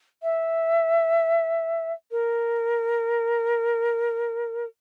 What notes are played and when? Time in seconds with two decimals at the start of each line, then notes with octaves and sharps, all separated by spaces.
0.23 E5
2.11 A#4